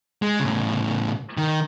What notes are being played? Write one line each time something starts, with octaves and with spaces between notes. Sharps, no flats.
G#3
A2 C#3
D#3